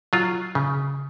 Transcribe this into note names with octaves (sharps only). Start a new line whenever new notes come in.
F#3 F4
C#3